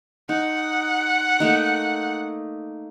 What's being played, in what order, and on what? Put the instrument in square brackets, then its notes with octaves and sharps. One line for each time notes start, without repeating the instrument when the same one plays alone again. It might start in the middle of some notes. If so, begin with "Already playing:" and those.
[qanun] D#4 [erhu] F#5
[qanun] A3 A#3 D#4